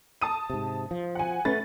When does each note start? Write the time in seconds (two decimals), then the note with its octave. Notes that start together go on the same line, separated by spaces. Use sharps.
0.22 A5 D#6 D#7
0.50 G#2 C3
0.91 F3
1.15 F#5 G#5
1.45 A3 C#4 B4 A6